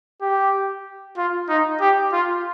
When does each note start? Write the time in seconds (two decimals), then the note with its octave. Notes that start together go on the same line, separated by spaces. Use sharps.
0.21 G4
1.17 F4
1.48 D#4
1.81 G4
2.13 F4